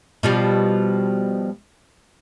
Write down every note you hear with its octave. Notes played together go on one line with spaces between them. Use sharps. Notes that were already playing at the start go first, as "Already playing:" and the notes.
B2 F3 G3